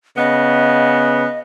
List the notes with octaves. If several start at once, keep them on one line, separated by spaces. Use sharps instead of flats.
C#3 B3 D#5